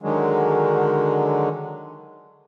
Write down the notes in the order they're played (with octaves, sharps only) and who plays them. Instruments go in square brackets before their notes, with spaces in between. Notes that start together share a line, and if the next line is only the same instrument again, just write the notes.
[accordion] D3 D#3 F#3 G#3